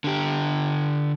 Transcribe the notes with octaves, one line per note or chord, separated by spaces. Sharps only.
D3 G4